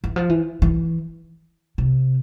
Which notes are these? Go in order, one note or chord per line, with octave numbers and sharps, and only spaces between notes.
E3
F3
E3
E3
C3